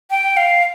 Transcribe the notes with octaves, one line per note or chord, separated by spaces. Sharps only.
G5
F5